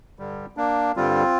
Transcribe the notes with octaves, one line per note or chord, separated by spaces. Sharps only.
G2 D3 G3
A#3 D4
G2 D3 G3 C4 F4